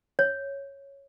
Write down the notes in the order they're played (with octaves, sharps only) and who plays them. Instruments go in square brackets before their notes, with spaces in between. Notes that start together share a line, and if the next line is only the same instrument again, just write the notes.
[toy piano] C#5